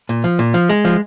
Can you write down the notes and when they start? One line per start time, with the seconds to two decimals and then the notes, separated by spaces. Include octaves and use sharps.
0.09 A#2
0.24 F3
0.39 A#2
0.54 F3
0.69 G#3
0.85 F3